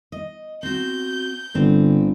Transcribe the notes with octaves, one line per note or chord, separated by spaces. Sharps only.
D#5
C4 F#4 G6
G1 G2 D3 C4